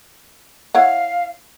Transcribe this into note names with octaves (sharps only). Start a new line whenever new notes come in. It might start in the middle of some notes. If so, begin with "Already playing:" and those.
E4 C#5 F5 F#5